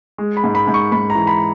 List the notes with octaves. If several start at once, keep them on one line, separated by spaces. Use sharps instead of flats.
G#3
B5
G#2
B5
G#2
C#6
G#2 B5
A#5
E3
B5